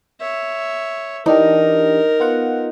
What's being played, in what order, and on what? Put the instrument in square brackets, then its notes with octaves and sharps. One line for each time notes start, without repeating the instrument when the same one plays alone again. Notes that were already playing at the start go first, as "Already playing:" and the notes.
[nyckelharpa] C#5 E5
[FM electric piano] E3 D4 G4 [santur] D#4 [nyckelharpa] A#4
[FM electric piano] B3 F4 F#5